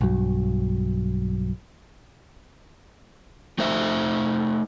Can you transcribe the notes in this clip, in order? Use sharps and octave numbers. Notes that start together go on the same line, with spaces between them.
B1 G2 F#3
A3 D#4 C5 E5